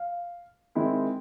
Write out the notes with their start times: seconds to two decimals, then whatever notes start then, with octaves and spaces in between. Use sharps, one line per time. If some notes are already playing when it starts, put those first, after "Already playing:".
Already playing: F5
0.75 D#3 G#3 C4 E4